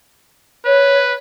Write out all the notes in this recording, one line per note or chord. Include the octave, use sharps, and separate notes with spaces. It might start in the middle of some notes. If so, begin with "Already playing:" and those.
B4 C#5